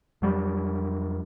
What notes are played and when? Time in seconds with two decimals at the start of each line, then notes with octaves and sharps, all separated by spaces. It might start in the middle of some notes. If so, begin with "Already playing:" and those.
0.22 F2 F#3 G3